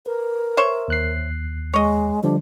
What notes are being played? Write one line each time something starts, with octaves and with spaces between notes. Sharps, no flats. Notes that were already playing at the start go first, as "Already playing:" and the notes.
A#4 B4
C5 C#5 E5
D#2 F#6 C7
G#3 C#5 D#5
D3 F3 G3 D4